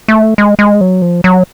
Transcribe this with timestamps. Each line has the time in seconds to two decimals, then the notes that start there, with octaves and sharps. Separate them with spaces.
0.08 A3
0.38 G#3
0.59 G#3
0.81 F#3
1.02 F3
1.24 F#3